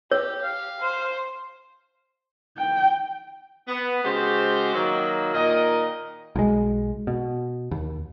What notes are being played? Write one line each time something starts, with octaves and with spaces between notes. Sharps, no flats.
G4 C#5
F5
C5
G5
B3
C#3 G#3 F#4 G4 C5
D#3 F#3 A#3
A#2 D#3 A#3 A#4 D#5
B1 G#3
B2
D#2